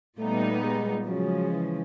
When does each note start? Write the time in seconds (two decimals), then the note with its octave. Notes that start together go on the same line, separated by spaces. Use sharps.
0.19 A#2 G3 A3 B3 D#4
0.62 G#3
1.07 C#3 F3 F#3 G#3
1.51 E3